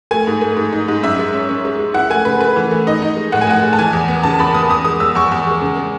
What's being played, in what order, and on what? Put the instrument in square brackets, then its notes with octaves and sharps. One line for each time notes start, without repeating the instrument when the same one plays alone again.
[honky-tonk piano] A3 G#5
G#2
A3
G#2
D#4
G#2
F#2 E5
G#3
C#4
C#4
G#3
G#3
E4 F#5
A3 G#5
C#3 B4
A3 B4
E3
A3
D#4 D#5
D#4
G#3
A2 F#5
G#5
A2 F#5
G#3
A5
E3 G#5
E2
B3
C#3 A5
E2 B5
B3 D#6
E2 D#6
G#3 D#6
E2 E6
E2 C#6
E2
G#3
C#3
G#3